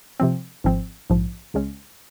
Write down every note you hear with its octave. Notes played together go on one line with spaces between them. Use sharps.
C3 F3 C4
G#1 G#2 F3 C4
A#1 G#2 F3
C#2 C#3 G#3 C#4